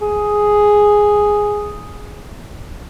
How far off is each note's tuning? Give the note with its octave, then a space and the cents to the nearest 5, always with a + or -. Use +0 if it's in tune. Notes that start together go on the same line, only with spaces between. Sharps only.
G#4 +0